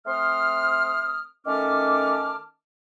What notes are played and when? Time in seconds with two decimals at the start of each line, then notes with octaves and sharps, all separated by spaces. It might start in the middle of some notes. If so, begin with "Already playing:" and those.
0.06 A3 C4 C6 D#6 F6
1.46 D#3 A3 C#4 A5 D6 F6